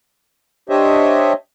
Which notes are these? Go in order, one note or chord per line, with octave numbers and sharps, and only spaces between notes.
D4 G4 C5 C#5 D#5 E5